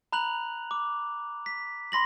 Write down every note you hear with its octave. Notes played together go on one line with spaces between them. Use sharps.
A#5 B5 F#6 F7 F#7
D6
B6
B5 C6 A#6 F#7